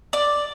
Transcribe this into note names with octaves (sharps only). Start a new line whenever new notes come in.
D5